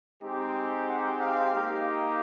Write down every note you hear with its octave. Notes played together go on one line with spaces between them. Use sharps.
G#3 C4 D#4 G4
F#5
F5
A#3 D#4 G4